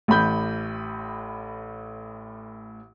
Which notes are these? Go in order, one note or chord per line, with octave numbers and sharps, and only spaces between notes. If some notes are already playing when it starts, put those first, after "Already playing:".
A1 A2 B5 G6